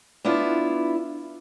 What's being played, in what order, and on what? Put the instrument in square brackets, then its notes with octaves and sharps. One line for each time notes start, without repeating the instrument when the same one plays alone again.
[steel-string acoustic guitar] B3 D4 E4 F4